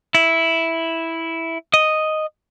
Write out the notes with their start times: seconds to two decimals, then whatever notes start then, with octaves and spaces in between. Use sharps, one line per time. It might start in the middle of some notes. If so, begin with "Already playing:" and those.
0.15 E4
1.74 D#5